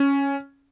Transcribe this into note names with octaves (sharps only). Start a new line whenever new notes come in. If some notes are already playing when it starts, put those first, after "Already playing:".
Already playing: C#4